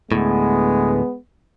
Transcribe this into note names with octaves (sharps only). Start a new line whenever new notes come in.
D2 A2 G#3 B3